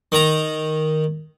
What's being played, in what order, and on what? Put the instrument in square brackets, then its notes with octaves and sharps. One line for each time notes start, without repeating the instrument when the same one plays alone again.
[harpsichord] D#3 A#5